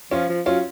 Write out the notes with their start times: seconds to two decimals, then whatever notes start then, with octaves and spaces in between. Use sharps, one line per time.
0.11 F3 C#4 F4
0.29 F3
0.46 F#3 C#4 F4